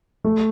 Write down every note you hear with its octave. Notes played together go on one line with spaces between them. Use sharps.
A3